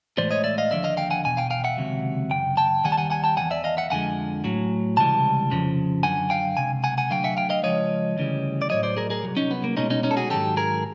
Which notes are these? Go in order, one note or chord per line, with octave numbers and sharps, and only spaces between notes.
A2 E3 G#3 C5 D5
C#5 D#5
D5 E5
D#5 F5
D#2 D3 F3 D5 E5
D#5 F5
F5 G5
F#5 G#5
E2 B2 G#5
F5 G5
F5 G5
E5 F#5
C#2 C3 D#3 F#3
F#2 C#3 G5
G5 A5
D#2 D#3 G3 F#5 G#5
A5
F#5 G#5
F#5 G#5
G5 A5
E2 C3 E3 F#5 G#5
D5 E5
D#5 F5
E5 F#5
F2 D3 F3 G#3 F#5 G#5
A2 F#3
C#2 C3 E3 G3 A5
F2 C#3 F3
F#2 D3 F#3 F#5 G#5
F5 G5
C#2 C3 G#5
F#5 G#5
F#5 G#5
D2 D3 F#3 F5 G5
E5 F#5
F5 G5
D#5 F5
C#2 C#3 F3 G#3 C#5 D#5
D2 C#3 E3 G3
D5
A2 F#3 C#5 D#5
C5 D5
G#4 A#4
G#4 A#4
C2 B2 F#3
C#4 D#4
B3
A#3
C2 B2 G#3 C#4 D#4
C#4 D#4
C#4 D#4
A4
F#4 G#4
G#2 D#3 F#3 G4 A4
G#4 A#4